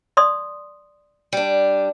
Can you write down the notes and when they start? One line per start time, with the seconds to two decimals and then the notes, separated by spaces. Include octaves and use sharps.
0.17 D5 C6 D#6
1.33 G3 D4